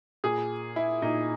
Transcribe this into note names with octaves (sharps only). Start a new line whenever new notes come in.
A#2 G#4
E4
A#2 D#4